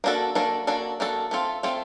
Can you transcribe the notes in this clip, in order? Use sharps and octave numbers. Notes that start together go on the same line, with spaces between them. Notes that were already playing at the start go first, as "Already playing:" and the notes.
A#3 D4 F#4 A4
A#3 D4 F#4 A4
A#3 D4 F#4 A4
A#3 D4 F#4 A4
A3 C4 F4 A4
A3 C4 F4 A4